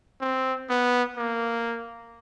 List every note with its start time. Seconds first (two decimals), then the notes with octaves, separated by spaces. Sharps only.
0.21 C4
0.70 B3
1.17 A#3